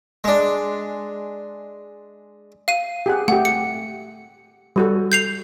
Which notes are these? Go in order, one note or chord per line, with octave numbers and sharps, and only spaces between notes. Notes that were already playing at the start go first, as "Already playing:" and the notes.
G#3 D4
F5 D#7
G4 G#4 F#5
A3 G4 F#5
C#7
G3 F#4 A4
G6 C7 F7